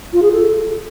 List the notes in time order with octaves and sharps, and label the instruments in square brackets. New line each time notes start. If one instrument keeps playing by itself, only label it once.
[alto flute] F4
G#4
A4